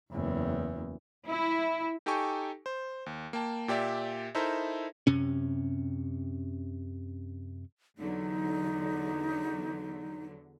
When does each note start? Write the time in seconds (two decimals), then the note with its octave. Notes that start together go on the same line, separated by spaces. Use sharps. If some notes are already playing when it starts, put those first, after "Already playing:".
0.12 F#1 E2
1.27 E4
2.06 D#4 G4 A4 G5 G#5 C#6
2.66 C5
3.06 D#2
3.33 A#3 G5 A5
3.68 A#2 G4 D5 E5
4.35 D#4 E4 A4 A#4 C5 E5
5.07 F#2 C3 C#4
7.98 E2 D3 F#3 D#4